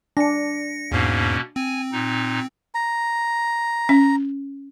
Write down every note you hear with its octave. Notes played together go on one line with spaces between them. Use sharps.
D4 A#6 C#7
E2 G#2 B2 A#3 C#4
C4 G#5
A#2 D#4
A#5
C#4